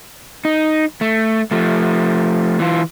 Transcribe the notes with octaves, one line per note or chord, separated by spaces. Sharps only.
D#4
A3
F3 A3
E3 F4